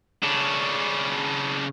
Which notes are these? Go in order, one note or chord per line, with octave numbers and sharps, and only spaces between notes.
C#3 D4